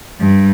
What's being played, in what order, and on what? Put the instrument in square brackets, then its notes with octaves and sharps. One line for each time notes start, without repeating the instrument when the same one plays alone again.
[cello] G2